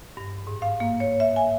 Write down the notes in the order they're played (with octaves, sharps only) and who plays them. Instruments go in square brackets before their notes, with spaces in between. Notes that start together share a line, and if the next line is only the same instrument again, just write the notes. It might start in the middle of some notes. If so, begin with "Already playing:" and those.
[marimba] G2
G#2
F5
A#3
C#5
E5
G#5